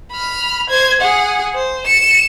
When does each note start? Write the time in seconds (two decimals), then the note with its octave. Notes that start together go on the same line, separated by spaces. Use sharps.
0.12 B5 F6
0.69 C5 G#6
1.01 G#4 F#5
1.54 C5
1.87 C#7 E7